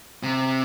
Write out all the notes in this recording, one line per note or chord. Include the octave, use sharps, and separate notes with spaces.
C3